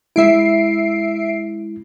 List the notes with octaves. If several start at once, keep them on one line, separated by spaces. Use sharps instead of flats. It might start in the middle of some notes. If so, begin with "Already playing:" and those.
G#3 E4 E5 C7 D7